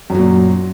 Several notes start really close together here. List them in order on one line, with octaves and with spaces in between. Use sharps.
F#2 F#3 A#2